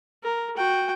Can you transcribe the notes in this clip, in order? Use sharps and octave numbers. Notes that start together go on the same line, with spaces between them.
A#4
F#4 G5